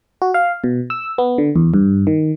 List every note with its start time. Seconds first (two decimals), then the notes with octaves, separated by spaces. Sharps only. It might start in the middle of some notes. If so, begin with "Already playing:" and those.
0.22 F#4
0.34 F5
0.64 B2
0.90 E6
1.18 B3
1.38 D3
1.56 E2
1.74 G2
2.07 D#3